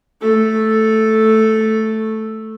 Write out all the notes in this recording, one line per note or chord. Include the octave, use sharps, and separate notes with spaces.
A3 A4